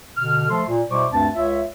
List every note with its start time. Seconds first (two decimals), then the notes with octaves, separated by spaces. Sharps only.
0.16 B2 D3 F6
0.48 F3 A3 A4 C6
0.68 A#2
0.89 B2 G3 E4 C5 C#6 D6
1.12 D2 G2 C4 A5
1.35 C#2 F4 C#5 E5